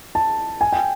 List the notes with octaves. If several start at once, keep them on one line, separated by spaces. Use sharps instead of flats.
A5
G#5
G5